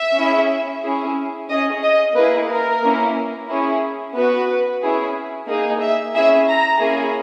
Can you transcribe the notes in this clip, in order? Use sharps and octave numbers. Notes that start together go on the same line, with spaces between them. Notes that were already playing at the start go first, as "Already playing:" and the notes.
Already playing: E5
C#4 E4 G#4
C#4 E4 G#4
C#4 G#4 D#5
D#5
A#3 E4 G#4 B4
A#4
A#3 C#4 E4
C#4 E4 G#4
B3 F#4 B4
C#4 E4 G#4
A#3 D#4 G#4
E5
C#4 E4 G#4 E5
A#5
A#3 C#4 E4 G#4